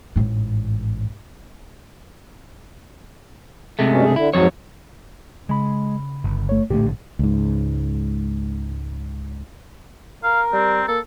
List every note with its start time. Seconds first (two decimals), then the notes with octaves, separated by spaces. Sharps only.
0.16 A1 G#2
3.79 C3 G#3 A3
3.90 G2 B2 C#4
4.04 G2 C#3 G#4
4.16 D3 E4
4.34 F2 G#2 F#3 C#5
5.49 C#3 G#3 B5
6.24 G1
6.49 A3 C#5
6.70 A#1 A2 D3 A3 G4
7.19 C#2 G#2
10.24 A#4 F5
10.53 G3 C4
10.88 A#3 A4